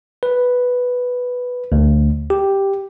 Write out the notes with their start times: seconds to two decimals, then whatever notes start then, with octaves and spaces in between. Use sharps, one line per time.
0.23 B4
1.72 D2
2.30 G4